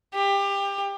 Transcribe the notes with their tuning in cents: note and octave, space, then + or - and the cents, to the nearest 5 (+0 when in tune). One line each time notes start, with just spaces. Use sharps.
G4 +25